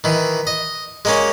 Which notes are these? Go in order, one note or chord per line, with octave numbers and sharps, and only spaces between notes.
D#3 E3
D#5
G#3 A#3 C#4